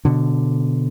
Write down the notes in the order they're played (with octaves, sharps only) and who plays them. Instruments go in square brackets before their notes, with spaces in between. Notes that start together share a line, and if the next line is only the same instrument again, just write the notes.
[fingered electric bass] B2 D3